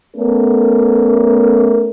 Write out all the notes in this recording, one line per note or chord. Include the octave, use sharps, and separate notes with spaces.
A3 B3 C#4 A4 A#4